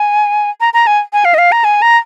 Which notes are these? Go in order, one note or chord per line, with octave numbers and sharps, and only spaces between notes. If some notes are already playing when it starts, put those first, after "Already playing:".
Already playing: G#5
A#5
A#5
G#5
G#5
F5
D#5
F5
A#5
G#5
A#5